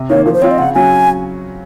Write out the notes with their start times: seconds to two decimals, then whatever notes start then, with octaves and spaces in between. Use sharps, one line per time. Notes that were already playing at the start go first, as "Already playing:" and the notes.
Already playing: C3
0.10 D#3 A#3 C#5
0.26 F3 A#4
0.33 C5
0.42 C4 F4 C#5
0.51 D#5
0.58 C#3 F#5
0.75 F#3 C#4 F#4 G#5